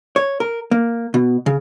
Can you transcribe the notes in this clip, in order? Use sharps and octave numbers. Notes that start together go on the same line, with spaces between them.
C#5
A#4
A#3
B2
C#3